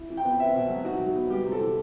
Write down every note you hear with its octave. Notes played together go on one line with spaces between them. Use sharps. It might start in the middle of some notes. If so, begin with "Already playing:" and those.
Already playing: E4
E3
G5
B3
C4 E5
B2
F#3
D#4 F#4
F#3
B3
G3 G4
C3
A4
E3